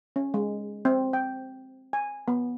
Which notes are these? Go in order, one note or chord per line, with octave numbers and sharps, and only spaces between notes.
C#4
G#3
C4
G5
G#5
B3